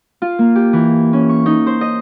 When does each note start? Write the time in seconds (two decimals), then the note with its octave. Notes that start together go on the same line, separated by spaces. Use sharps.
0.22 F4
0.39 A#3
0.55 G4
0.73 E3
1.13 C#4
1.29 C#6
1.46 D#4
1.67 C5
1.81 D#5